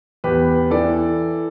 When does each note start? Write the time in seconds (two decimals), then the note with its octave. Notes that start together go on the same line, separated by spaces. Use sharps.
0.24 E2 G4 B4
0.71 E3 A4 D5